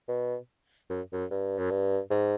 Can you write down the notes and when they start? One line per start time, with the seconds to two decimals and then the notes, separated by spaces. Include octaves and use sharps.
0.08 B2
0.90 F#2
1.12 F#2
1.30 G2
1.59 F#2
1.71 G2
2.10 G#2